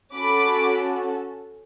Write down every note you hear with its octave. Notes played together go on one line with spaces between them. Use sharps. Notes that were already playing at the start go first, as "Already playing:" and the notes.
C#4 F#4 A4 B5 D6